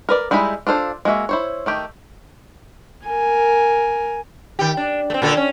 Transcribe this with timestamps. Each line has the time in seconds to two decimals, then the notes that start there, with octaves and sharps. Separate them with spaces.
0.09 A#4 B4 D5
0.31 G3 G#3 D#4 E4 B5
0.67 D4 F4 A4 C5
1.05 G#3 A#3 F#4 E5
1.29 E4 C5 C#5
1.66 D#3 A3 G4
3.06 A#4 G#5
4.59 D#3 G4
4.77 D4
5.10 A3 C4
5.22 A#2 D3 A4
5.37 C#4